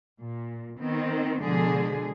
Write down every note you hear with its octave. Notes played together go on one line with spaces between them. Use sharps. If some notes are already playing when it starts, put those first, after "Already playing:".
A#2
D#3 B3 C4
B2 D3 F3 G#3 G#4